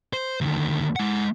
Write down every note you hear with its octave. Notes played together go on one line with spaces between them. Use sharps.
C5
D2 D#3
G#3 F#5